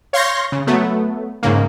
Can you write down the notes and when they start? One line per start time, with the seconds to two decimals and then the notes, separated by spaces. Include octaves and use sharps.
0.13 C#5 F5 C6 C#6 G6 A#6
0.52 C#3
0.67 F#3 A3 B3
1.43 G#2 C#3 A#3